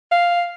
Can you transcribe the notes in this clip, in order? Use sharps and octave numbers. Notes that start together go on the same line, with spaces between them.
F5